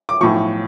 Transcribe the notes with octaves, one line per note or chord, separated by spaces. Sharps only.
D6
B1 A2 F3 C#6